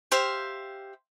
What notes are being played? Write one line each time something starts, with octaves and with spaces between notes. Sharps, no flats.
G4 C5 E5 F5